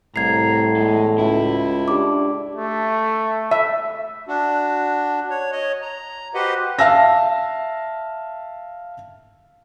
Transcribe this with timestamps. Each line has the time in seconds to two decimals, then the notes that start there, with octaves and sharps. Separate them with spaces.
0.16 C2 A2 A#5 G#6 C7
0.77 E2 G#3
1.18 C#2 E4 F#4
1.88 D4 G4 D6
2.55 A3
3.51 E5
4.28 D4 F#4
5.30 C#5
5.52 C#5 D#5
5.82 A#5
6.35 F#4 G4 B4 C5 D#5 F#5
6.79 E5 F5 A5 E6 A#6